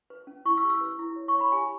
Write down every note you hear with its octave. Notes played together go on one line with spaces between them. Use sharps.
B4
C#4
E4 C#6
E6
G4
E6
B4
E4
C#5
C#6
C#5
B5
G4 G#5